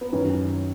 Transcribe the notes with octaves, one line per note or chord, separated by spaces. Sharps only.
B3
F#2 D#3 C#4